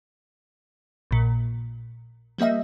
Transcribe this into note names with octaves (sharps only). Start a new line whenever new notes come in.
A#1 A#2
F3 G3 A#3 D#5 E5